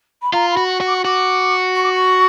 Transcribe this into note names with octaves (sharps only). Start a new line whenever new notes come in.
B5
F4 A#5
B5
F#4
C#6
F#4
D6
C#6
F#4 D6
C#6
D6
C#6